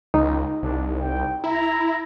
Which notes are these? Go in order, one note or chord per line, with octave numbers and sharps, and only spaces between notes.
C#2 D#4
C2 D4
G5
E4 A#5